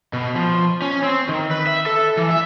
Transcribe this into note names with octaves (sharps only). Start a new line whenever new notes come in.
B2
F3
C#4
C4
D#3
B4
E5
A4
E3
E5